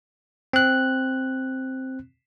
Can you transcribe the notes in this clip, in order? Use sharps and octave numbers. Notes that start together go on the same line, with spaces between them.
C4 F#6